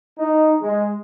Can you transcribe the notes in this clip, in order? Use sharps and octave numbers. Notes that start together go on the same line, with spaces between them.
D#4
G#3